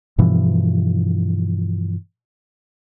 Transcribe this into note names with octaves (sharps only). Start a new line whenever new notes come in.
G2 B2 E3 F3